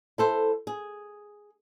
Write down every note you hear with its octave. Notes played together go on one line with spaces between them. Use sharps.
E4 A4 C5
G#4